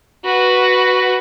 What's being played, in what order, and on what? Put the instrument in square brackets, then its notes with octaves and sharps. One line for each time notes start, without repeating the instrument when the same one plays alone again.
[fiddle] F#4 B4